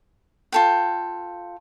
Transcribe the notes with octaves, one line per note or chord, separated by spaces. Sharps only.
F4 A4 G5